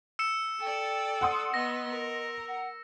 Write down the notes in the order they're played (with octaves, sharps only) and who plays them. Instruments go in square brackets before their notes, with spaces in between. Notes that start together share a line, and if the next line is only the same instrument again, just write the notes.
[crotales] E6 C#7 E7
[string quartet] A4 D5 [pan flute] G5
[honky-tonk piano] F#5 C6 D#6
[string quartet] B3 [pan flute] D#5 [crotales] A#6
[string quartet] A#4
[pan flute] F#5